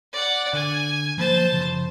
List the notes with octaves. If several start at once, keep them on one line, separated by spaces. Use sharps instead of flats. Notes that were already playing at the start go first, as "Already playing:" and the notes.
D5 F#5
D3 G#5
F3 F#3 A#3 C5 A5
F#2 C#3 F3